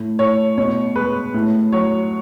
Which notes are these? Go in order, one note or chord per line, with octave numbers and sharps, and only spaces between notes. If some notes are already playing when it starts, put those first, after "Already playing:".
Already playing: A2
A2 C#5
B2 C#5
G#3 B4
A2
F#3 C#5